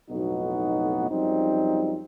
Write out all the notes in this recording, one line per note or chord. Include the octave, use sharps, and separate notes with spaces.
B1 F2 A2 B3 D#4 F#4
F#2 F3 G3 C4 D#4